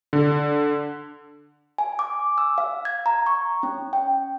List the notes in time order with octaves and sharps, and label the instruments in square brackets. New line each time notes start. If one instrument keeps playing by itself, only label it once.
[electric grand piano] D3
[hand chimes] G#5
D6
E6
F5
G#6
A#5
C#6
C#4
G5